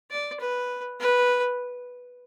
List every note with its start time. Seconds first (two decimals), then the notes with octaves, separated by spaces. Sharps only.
0.11 D5
0.40 B4
1.00 B4